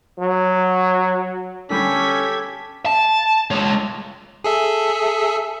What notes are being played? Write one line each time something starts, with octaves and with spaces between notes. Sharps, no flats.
F#3
D3 G3 C#4 G4 A4 G#6 B6
A5
G#3 C#5
G#4 A4 E5